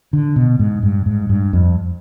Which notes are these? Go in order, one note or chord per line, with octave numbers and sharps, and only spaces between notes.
D3
B2
G#2
G2
G#2
G2
F2